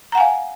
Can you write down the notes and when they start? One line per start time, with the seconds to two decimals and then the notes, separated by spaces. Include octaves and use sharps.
0.12 A#5
0.15 F#5
0.18 G#5
0.20 F5